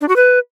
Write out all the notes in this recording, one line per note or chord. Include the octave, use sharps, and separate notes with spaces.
D4
F#4
B4